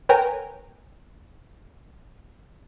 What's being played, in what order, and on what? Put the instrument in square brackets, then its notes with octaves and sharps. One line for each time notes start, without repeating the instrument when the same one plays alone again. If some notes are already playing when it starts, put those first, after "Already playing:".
[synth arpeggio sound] A#4 B4 C#5 G5 G#5 A#5